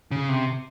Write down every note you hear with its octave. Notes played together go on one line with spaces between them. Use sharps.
C#3
C3